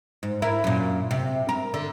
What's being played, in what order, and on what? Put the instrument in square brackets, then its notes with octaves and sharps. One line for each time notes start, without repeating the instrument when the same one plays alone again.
[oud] G#2
E4 A#4
F#2 A#2
C3
A#4
D3